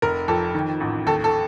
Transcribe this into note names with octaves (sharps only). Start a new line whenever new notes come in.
F1 A#4
F2 A4
D#3
A1
D#2 A4
A4